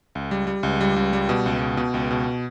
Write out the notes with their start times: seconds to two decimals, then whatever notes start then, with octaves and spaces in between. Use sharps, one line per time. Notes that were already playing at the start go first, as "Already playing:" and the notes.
0.15 C#2
0.31 G3
0.47 G3
0.63 C#2
0.81 G3
0.96 C#2
1.13 G3
1.29 B2
1.46 C#2
1.61 B2
1.77 B2
1.94 C#2
2.11 B2